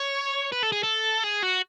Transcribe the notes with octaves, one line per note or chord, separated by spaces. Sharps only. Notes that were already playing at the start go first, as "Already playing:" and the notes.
Already playing: C#5
B4
A4
G#4
A4
G#4
F#4